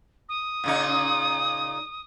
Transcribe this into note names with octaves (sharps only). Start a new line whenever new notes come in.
D#6
A#2 C#3 D#4